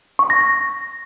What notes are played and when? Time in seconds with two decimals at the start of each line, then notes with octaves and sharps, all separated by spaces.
0.19 C#6
0.30 A#6
0.41 A#6